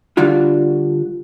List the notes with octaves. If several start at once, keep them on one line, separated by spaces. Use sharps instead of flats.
D3 G3 D4 F4 F#4